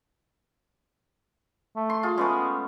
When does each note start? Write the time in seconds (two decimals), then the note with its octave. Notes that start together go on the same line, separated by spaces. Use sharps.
1.76 A3
1.90 C6
2.03 F4 G#4
2.18 G#3 A3 B3 C#4